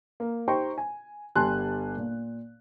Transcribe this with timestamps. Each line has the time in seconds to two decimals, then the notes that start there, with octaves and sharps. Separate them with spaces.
0.20 A#3
0.48 D#4 G4 C5 G5 A#5 C#6
0.78 G#5
1.36 G1 G3 G#5 A5 C6 F#6
1.97 A#2